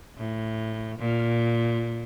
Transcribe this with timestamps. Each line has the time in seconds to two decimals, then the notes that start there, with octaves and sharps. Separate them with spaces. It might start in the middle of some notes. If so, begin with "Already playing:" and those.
0.17 A2
0.99 A#2